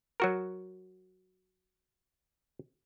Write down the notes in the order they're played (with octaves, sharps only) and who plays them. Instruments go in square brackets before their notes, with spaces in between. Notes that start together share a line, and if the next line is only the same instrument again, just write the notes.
[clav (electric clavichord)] F#3 F#4 A#4